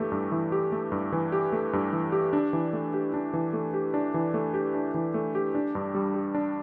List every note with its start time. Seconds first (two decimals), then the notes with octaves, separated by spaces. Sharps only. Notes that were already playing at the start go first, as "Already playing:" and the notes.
Already playing: G2 E3 A3 G4
0.12 G2
0.32 E3
0.52 G4
0.72 A3
0.92 G2
1.12 E3
1.32 G4
1.52 A3
1.73 G2
1.93 E3
2.12 G4
2.33 D4
2.53 E3
2.73 A3
2.94 G4
3.14 D4
3.33 E3
3.53 A3
3.74 G4
3.94 D4
4.14 E3
4.34 A3
4.54 G4
4.75 D4
4.94 E3
5.14 A3
5.35 G4
5.55 D4
5.75 G2
5.95 G3
6.14 G4
6.35 D4